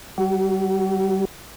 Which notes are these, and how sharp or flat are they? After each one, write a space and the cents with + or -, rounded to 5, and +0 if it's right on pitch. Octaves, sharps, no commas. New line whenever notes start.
G3 -20 F#4 +35